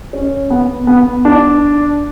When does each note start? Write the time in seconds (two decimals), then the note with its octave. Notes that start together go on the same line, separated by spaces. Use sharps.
0.13 C#4
0.50 B3
0.87 B3
1.25 D4